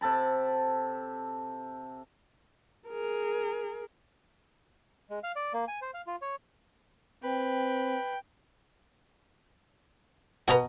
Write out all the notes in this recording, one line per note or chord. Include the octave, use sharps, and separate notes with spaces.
C3 A4 A5 B5
G#4 A#4
G#3
F5
D5
A#3
G#5
C5
F5
F4
C#5
C4 B4 G5
B2 F#4 B4 D#5 A#5